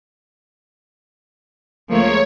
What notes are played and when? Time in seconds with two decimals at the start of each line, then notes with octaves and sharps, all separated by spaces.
1.89 C#2 F3 A3 A#3 C#5